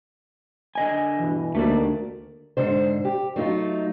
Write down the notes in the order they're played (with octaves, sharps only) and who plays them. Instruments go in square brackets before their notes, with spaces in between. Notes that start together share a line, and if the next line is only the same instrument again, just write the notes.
[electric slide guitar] D3 D#5 G#5
[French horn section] G2 B2 E3
[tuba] D2 [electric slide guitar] A3 A#3 D5 [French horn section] D#4 G4 A#4
[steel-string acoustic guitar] G#2 D3 C5
G4
F#3 A3 D#4 F4